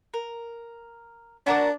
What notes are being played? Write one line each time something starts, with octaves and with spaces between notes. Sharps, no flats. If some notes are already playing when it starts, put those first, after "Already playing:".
A#4
D4 F#4 A#4 D5